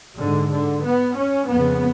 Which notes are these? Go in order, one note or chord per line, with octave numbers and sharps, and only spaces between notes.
G#2 D3
D3
B3
C#4
F2 C#3 B3